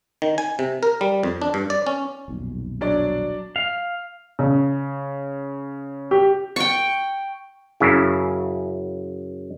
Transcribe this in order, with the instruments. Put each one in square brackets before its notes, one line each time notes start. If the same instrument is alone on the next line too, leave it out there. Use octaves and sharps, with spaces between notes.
[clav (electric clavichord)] D#3
G#5
C3
A#4
G3
F2
D4
G2
D5
C#4
[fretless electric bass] D#1 B1 F2
[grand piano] F#3 D4 D5
[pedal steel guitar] F5
[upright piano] C#3
G4
[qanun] G5 C#6
[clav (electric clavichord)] F#2 C#3 E4